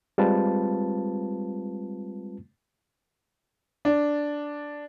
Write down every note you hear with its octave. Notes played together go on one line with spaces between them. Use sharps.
G3 G#3 C4 F4 B4 A5
D4